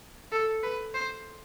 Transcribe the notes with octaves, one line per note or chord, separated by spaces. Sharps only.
A4
B4
C5